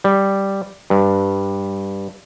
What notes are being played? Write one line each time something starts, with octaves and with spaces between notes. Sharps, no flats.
G3
G2